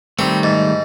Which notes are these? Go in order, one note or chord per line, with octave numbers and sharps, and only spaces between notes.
D#3 G3 A3 C4
G#2